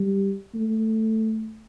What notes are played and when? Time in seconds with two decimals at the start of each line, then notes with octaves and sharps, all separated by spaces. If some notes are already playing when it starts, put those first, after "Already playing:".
Already playing: G3
0.55 A3